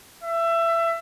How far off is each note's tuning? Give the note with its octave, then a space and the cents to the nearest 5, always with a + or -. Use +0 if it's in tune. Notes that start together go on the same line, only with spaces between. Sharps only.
E5 +25